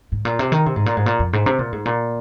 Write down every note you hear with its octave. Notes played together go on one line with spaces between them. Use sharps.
G#2
A#2
C3
D#3
C3
G#2
A#2
G#2
A#2
F2
G#2
C3
A#2
G#2
A#2